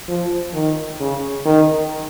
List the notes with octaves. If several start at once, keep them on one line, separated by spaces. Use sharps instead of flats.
F3
D#3
C#3
D#3